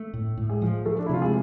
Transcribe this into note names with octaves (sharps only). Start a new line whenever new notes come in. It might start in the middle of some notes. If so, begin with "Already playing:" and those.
Already playing: A3
A2
A2
G#3 G#4
F3
F3 A3 A4
D4
E4
C3 F4
G#3 G#4